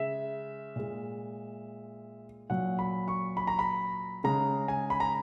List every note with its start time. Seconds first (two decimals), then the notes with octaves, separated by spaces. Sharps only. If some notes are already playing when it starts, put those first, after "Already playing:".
Already playing: C#3 G#3 E5
0.76 A#2 G#3
2.50 A#2 F#3 F#5
2.79 B5
3.08 C#6
3.37 B5
3.47 A#5
3.59 B5
4.24 C#3 G#3 A#5
4.68 G#5
4.90 B5
5.00 A#5